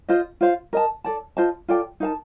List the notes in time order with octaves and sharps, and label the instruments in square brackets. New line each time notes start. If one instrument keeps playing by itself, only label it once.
[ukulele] F4 C5 D#5
F4 C5 F5
A#4 D#5 A5
A4 D5 A5
F4 C5 D#5 A5
F4 A4 D5 G5
D#4 A#4 F5 A5